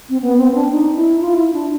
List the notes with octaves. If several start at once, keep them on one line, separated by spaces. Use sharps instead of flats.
C4
B3
C4
D4
D#4
E4
F4
E4
D4